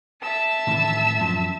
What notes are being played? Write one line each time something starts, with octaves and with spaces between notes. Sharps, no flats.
E5 A5 E6
A2 D#3 E3
F#2 F3